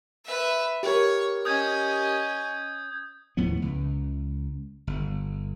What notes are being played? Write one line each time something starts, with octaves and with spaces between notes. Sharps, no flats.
B4 E5
G4 A#4 C#5
C#4 D#5 D#6 G6 G#6
D#2 A2 F3 B3
C#2
G1